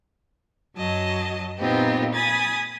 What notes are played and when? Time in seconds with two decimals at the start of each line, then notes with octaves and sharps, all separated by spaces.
0.77 F#2 F#3 D#5 A5
1.59 A#2 B3 C4 D#4 F4 G4
2.14 G#5 B5 D#6 G#6 A6